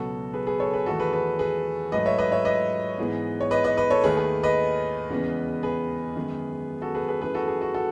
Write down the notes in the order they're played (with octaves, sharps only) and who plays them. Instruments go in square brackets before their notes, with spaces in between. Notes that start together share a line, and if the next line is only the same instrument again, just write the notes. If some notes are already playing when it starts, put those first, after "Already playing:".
Already playing: [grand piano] C#2 B2 F#3 B3 F#4 A4
G#4 B4
G#4 B4
A4 C#5
G#4 B4
E2 D#3 A3 F#4 A4
G#4 B4
G#4 B4
G#4 B4
G#2 F#3 A3 B4 D#5
C#5 E5
B4 D#5
C#5 E5
B4 D#5
G#2 E3 G#3 B3
C#5
B4 D#5
B4 D#5
B4 D#5
A4 C#5
D#2 D#3 A3 G#4 B4
G#4
B4 D#5
E2 C#3 G#3 B3
G#4 B4
F#2 D#3 G#3 B3
F#4 A4
G#4 B4
G#4 B4
F#2 E3 A3 G#4 B4
F#4 A4
G#4
F#4
F#4 A4